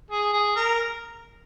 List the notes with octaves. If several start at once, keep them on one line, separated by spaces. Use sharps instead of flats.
G#4
G#4
A#4